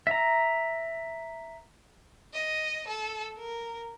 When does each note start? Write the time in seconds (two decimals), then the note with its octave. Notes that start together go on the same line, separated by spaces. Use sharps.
0.07 E5 A#5
2.33 D#5
2.87 A4
3.38 A#4